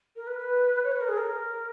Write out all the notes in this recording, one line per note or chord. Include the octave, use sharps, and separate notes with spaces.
A#4
B4
B4
C#5
B4
A#4
G#4
A#4